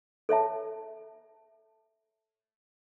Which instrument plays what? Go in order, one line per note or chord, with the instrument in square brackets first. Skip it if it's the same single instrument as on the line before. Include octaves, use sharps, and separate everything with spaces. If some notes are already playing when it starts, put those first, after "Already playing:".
[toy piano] A4 C#5 E5 A5